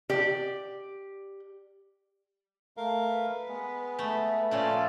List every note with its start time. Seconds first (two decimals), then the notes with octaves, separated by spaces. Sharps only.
0.10 G4 D5
2.77 A3 A#4 F5
3.11 B4
3.48 G#3 B3
3.99 A3 B4
4.51 A#2 F3 A3 C#4 A4 D5